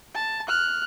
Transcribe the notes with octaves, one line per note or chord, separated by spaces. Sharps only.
A5
F6 F#6